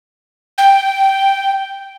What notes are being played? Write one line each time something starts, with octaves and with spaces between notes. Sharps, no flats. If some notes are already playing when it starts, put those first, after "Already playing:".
G5